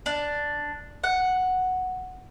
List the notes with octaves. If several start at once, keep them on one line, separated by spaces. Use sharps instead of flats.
D4
F#5